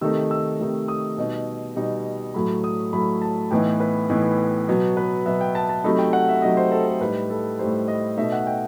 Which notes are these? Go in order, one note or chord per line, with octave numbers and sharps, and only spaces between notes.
C3 D#3 A3 D#4 E6
E6
C3 D#3 A3 D#4
D#6
B2 G3 D#4
B2 G3 D#4
A2 F#3 A3 B5
D#6
A2 F#3 A3 B5
A5
A2 E3 B3 D#4 G5
B4
A2 E3 B3 D#4
B2 F#3 B3
B4
B2 F#3 B3 E5
G5
A5
A5
C3 F#3 A3 D#4 B5
G5
F#5
E5
C3 F#3 A3 D#4 D#5
C5
A4
A4
A2 G3 D#4 B4
A4
A2 G3 D#4 C5
D#5
B2 A3 D#4 E5
F#5
G5